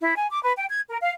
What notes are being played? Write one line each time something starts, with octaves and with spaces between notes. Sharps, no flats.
E4
G#5
D6
B4
G5
G#6
A#4
F5